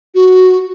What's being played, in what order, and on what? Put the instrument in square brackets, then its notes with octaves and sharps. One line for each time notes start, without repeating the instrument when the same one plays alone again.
[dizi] F#4